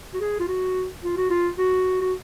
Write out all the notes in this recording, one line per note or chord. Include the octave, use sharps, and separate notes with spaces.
F#4
G#4
F4
F#4
F4
F#4
F4
F#4
F#4